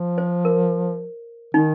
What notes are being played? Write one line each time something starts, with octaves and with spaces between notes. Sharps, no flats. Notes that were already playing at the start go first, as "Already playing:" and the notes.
Already playing: F3
C5
A#4
D#3 D#4